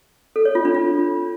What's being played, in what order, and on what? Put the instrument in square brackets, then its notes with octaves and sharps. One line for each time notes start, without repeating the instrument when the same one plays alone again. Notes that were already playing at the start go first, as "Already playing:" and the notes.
[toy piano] A4
C#5
F4
D4
F4